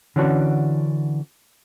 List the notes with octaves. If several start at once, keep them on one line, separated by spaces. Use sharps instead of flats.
D3 E3 C#4 D4 F#4